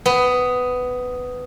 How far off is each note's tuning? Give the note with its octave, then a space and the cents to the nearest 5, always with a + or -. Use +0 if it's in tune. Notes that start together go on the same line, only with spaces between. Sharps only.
B3 +15